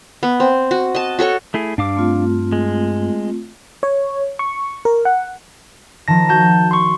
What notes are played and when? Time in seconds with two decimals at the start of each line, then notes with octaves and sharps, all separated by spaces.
0.23 B3
0.40 C4
0.71 F#4
0.95 D#5 A5
1.19 F#4 A4 C#5 C#6
1.54 A3 E4 G#4
1.78 G2 D4 F5 D6
1.96 A3 C4 F4
2.52 G#3
3.83 C#5
4.39 C#6
4.85 A#4
5.05 F#5
6.08 D#3 F3 A5 A#6
6.29 F#4 A5 G6
6.71 C6 C#6